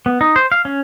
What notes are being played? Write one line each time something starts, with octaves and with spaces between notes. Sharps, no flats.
B3
D#4
C5
F5
C#4